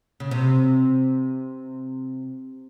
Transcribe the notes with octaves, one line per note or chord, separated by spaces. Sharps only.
C#3
C3